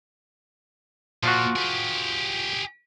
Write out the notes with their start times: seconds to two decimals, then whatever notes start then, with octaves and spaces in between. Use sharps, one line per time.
1.23 A#2 F3 F4 F#4
1.56 G4 G#4